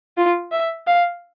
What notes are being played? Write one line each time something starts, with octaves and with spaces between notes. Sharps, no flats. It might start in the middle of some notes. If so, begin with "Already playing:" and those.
F4
E5
F5